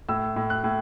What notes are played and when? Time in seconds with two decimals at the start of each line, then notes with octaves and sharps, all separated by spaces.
0.09 A2 E6
0.36 A2
0.50 F#6
0.64 A2